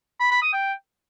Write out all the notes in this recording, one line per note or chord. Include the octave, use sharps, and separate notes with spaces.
B5
B5
D#6
G5